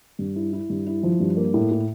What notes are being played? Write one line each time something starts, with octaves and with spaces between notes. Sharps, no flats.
G2
E4
E4
G2
E4
F3
G2
A#3
A2
A2